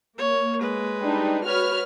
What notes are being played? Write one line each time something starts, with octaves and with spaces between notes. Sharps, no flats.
A#3 C#5
G#3 B4
G3 D4 D#4
F#4 B4 C#5 F6